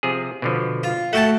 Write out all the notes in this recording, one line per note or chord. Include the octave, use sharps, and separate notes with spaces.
C3 F3 G#4
B2 D3 F3
F4
A3 F#4 F#5 G5 A5